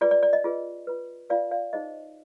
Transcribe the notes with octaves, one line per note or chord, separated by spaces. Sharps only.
F4 G#4 B4 D5
D5
D5
D#5
F4 G#4 B4
F4 B4
F4 B4 D5 F5
D5 F5
D#4 G#4 C5 D#5